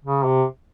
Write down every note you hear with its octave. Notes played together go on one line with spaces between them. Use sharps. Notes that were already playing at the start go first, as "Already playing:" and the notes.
C#3
C3